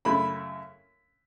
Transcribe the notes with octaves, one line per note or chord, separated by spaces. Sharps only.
F#2 C#3 A3 E4 B5